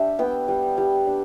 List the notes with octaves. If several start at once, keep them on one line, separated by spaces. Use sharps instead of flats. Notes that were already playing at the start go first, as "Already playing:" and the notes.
Already playing: G3 D4 E5
B3 G5
G3
G3
D4